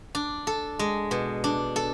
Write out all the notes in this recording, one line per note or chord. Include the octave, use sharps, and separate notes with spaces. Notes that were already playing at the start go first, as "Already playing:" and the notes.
D4
A4
G#3
B2
D4
A4